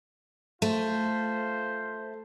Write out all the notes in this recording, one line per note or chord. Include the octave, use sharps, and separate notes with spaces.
A3 F4 C5